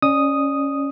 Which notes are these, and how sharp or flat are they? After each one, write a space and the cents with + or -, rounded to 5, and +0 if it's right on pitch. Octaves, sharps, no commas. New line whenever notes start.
C#4 +0 D5 +30 D#6 +0